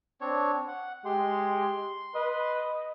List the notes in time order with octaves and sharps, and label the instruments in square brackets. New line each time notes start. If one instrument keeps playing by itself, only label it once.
[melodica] C4 D4 C#5
F#5
[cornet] G#3 [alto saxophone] G4 [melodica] C6
[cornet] B4 [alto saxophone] D#5